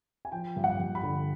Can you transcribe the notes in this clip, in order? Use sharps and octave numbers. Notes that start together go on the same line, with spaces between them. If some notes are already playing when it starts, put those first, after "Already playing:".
G#5
F3 G5
G2
F#5
G2
B5
D3